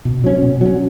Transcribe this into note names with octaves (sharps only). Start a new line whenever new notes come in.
B2
F#3 C#4
B2
F#3 C#4